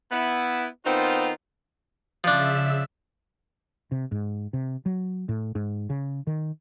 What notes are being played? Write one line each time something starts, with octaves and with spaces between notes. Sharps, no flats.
B3 E4
D#3 B3 C4 D#4 F4
C#3 F3 D4 E5 E6
C3
G#2
C3
F#3
A2
G#2
C#3
D#3